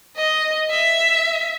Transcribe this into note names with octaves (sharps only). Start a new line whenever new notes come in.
D#5
E5